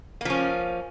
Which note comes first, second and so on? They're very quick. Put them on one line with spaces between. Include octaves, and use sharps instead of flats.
A#3 F3 C#4